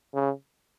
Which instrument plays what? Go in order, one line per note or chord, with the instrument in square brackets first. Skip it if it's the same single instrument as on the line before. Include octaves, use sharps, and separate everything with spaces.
[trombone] C#3